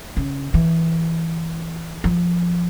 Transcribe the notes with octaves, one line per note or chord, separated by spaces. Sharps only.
C#3
E3
F3